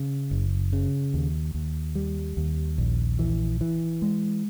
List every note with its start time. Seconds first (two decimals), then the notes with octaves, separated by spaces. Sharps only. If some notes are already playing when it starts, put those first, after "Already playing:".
Already playing: C#3
0.31 F#1
0.73 C#3
1.14 D#2
1.55 D#2
1.95 G3
2.37 D#2
2.78 A#1
3.19 E3
3.61 E3
4.02 G#3